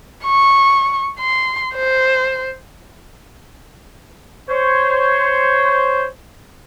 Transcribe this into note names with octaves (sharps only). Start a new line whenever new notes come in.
C#6
C6
C5
C5 C#5